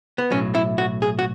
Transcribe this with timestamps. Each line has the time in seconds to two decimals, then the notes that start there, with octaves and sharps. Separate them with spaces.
0.18 B3
0.30 B1 A2 F#3 C#4
0.55 E4
0.78 F#4
1.02 G#4
1.19 F#4